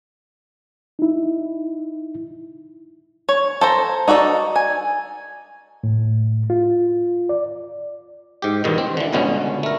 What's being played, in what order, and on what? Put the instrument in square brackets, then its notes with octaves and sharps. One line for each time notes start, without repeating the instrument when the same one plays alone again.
[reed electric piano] D#4 E4
[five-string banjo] C#5
A4 C5 A#5
D#4 F#4 A4 D5
G#5
[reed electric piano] A2
F4
D5
[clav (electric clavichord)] G#2 G4
E2 G2 B2 D#3
C4
D3 E3
G1 C#2 B2 D3 B3 C#4
A3 A#4